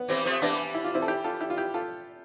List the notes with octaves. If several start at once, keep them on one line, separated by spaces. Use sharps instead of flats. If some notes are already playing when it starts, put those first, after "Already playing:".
Already playing: B3
E3 G3 C4
F3 A3 C4
E3 G3 B3 D4
E4
F4
C4 E4
A4
E4 G4
F4 A4
E4 G4
F4
E4 G4
F4 A4